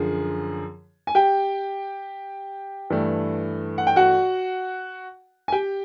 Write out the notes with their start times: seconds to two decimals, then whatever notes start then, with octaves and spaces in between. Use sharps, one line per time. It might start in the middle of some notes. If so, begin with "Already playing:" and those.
Already playing: F#2 D3 F3 G#4
1.07 G#5
1.15 G4 G5
2.90 G2 E3 A3
3.78 F#5
3.87 G5
3.96 F#4 F#5
5.48 G#5
5.52 G4 G5